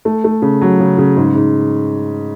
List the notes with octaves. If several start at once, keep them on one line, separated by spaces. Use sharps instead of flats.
A3
A3
C#3
F#3
C#3
C#3
G#2
G#2